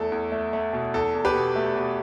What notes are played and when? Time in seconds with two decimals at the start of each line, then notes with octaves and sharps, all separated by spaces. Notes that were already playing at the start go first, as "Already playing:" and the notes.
Already playing: E2 A3 A4
0.12 E2
0.32 A3
0.53 A3
0.73 B2
0.94 E2 A4
1.15 E2
1.25 G4 B4
1.35 B2
1.56 A3
1.76 B2